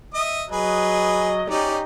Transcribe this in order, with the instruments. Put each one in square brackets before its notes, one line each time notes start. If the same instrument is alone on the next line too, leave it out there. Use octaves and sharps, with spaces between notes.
[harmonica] D#5 E5 D#6
[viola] F#3 D#5 [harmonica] G#4 B4
[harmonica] C#4 D5 [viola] D#4 G4